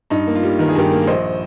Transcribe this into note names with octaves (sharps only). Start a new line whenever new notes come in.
G2 D#4
A#3
F4
G3
D#3 A#4
G#4
G2 G4 A#4
A#3
A#1 C5 D#5